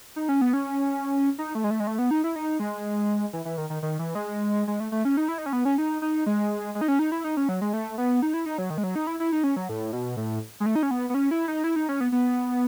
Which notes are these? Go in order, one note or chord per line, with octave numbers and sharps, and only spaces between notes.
D#4
C#4
B3
C#4
D#4
A3
G#3
A3
G#3
A3
B3
D#4
E4
D#4
G#3
E3
E3
D#3
D#3
D#3
E3
G#3
G#3
A3
A3
C#4
D#4
E4
D#4
C#4
B3
C#4
D#4
D#4
G#3
G#3
D#4
C#4
D#4
E4
D#4
C#4
F#3
G#3
A3
B3
D#4
E4
D#4
F#3
D#3
G#3
F#3
D#4
E4
E4
D#4
C#4
F#3
A2
B2
A2
G#3
A3
D#4
C#4
B3
B3
C#4
E4
D#4
E4
D#4
C#4
B3
B3